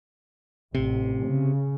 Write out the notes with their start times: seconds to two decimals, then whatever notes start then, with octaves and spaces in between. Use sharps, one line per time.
0.75 A1 C3
1.27 C#3